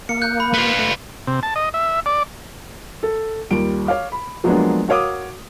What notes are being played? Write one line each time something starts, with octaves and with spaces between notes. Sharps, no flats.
A#3 C#7
F#6 G6
B5
B3 F4
A3
C3
A5
D#5
E5
D5
A4
D#2 G3 F4 D7
C#5 F5 D6
B5
F3 F#3 G#3 A#3 B3 D4
F#4 A#4 C#5 F5 D6 D#6